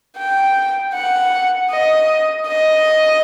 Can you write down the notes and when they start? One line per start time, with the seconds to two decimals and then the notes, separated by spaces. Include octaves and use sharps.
0.18 G5
0.94 F#5
1.71 D#5
2.47 D#5